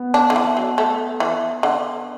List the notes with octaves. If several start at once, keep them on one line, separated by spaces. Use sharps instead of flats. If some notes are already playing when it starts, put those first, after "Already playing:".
Already playing: B3
D4
D3
E3
F#3
A3
E3
D3